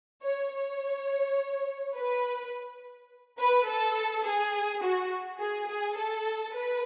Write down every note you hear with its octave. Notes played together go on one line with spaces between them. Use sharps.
C#5
C#5
B4
B4
A4
G#4
F#4
G#4
G#4
A4
B4